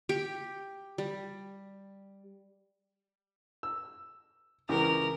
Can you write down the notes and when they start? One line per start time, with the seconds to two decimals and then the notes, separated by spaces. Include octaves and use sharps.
0.09 G4
0.98 G3
3.63 E6
4.69 C#2 E3 G4 A#4